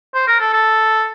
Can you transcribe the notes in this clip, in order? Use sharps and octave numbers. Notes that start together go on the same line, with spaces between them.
C5
A#4
A4
A4